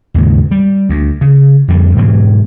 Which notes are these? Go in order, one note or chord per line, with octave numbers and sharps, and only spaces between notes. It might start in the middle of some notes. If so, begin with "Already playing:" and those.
D#2 G#2 C#3
G3
D2
C#3
F2 D3 G3
G#2 B2 E3 F#3